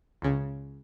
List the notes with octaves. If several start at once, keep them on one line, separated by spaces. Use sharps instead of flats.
C#2 C#3